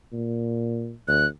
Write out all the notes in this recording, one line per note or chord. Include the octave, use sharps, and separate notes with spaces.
A#2
D2 F#6